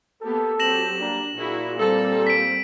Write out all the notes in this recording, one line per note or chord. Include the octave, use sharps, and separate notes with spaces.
A#3 B3 G4 A4
F#3 C4 G4 A#6 E7 F#7
G3 A#3 D4
A#2 E4 F#4 G#4
G3 C4 A4
B6 D7